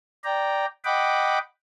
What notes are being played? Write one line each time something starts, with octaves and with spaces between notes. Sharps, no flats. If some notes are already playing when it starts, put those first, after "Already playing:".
D5 G5 A#5
D#5 F#5 G5 B5 D6